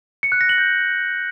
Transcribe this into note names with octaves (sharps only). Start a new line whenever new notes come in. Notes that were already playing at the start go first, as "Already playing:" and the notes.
C#7
F#6
A#6
F#7
G6